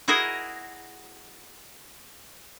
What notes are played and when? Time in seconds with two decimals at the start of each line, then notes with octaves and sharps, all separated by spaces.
0.08 E4 F#4 G#4 A#4 D#5